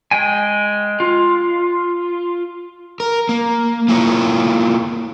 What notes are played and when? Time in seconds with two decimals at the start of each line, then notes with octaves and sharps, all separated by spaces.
0.11 G#3 G5 G#5
1.00 F4
3.00 A#4
3.29 A#3
3.88 A#3 E4 F4 C#5